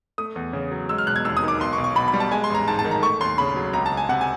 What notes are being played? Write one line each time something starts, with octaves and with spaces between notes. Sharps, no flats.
A3 D#6
E2
C#3
F#3
G#3 E6
F6
E1 F#6
G#6
D#2 E6
D#6
D#3
D6
B1 C6
C#6
B1
C#6
B2 B5
B5
G3
A5
G#3 G#5
C6
A1 A#5
G#2 A5
A5
D#3
A#5
A3 C#6
D#2 C6
C#3 B5
F#3
C#2 A#5
A5
C#2
G#5
C3 F#5
G#5